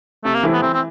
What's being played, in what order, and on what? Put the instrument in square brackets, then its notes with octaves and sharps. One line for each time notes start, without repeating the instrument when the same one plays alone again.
[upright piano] C3 [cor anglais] A3
[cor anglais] A#3
[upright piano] E3 A3 C4 E4
[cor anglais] B3
[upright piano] E3 [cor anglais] C4
[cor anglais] C4